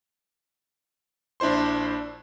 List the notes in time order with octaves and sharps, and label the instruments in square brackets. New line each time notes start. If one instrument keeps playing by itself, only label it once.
[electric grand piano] A#1 D4 E4 C5 C6